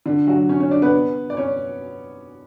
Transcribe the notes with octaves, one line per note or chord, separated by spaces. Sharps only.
D3 D4
F#3 F#4
C#4 C#5
C#4 C#5
D4 D5
B3 B4
D5
C#4 C#5